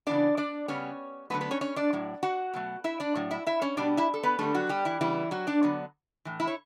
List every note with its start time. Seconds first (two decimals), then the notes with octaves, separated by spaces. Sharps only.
0.07 C#3 E3 B3 D4 D5
0.37 D4 D5
0.68 C#3 G3 B3 C#4 C#5
1.30 D3 F#3 A3 B3 B4
1.41 B3 B4
1.51 C#4 C#5
1.61 C#4 C#5
1.76 D4 D5
1.93 A2 F#3
2.23 F#4 F#5
2.54 B2 F#3 A3
2.84 E4 E5
3.00 D4 D5
3.15 A2 F#3
3.31 E4 E5
3.47 E4 E5
3.62 C#4 C#5
3.77 B2 G3 B3 D4 D5
3.97 E4 E5
4.14 A4
4.23 B3 B4
4.39 D3 G3 A3 B3 A4
4.54 F#3 F#4
4.69 G3 G4
4.85 E3 E4
5.01 C#3 E3 G3 B3 E4
5.31 F#3 F#4
5.47 D4 D5
5.63 D3 F#3 B3
6.25 A2 E3
6.40 E4 E5
6.47 C#5